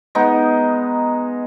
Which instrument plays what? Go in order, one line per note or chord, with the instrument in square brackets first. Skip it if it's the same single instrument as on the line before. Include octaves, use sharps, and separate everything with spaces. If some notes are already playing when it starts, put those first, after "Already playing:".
[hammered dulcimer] G#3 B3 D#4